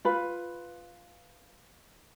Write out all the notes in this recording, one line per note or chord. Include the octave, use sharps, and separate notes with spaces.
F4 B4 B5